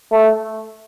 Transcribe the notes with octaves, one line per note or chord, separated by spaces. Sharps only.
A3